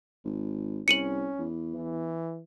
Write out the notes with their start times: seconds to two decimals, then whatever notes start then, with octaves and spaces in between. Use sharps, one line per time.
0.24 G#1
0.88 C2 C#4 C#7 D#7 F#7
1.39 E2
1.75 E3